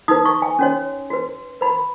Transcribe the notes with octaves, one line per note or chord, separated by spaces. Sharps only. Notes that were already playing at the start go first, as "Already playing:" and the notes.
D#4 B4 D#6
C#6
G#5
C#4 F#4 C#5
F#4 B4
F#4 B4 B5